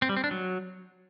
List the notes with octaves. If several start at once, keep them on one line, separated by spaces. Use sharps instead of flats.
C4
G3
C4
D4
F#3